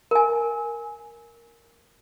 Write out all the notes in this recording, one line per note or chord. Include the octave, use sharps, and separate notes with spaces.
A#4 G#5